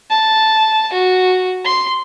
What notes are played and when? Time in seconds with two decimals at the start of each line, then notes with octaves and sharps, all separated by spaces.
0.10 A5
0.93 F#4
1.65 C6